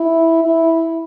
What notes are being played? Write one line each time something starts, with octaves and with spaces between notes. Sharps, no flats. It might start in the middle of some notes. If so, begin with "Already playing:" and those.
Already playing: E4
E4